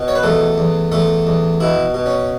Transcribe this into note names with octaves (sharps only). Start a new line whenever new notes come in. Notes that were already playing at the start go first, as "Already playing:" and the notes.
Already playing: B2
C#5
B4
E2 A3 A4
E2
E2 A3 A4
E2
B2 E4
B2
C#4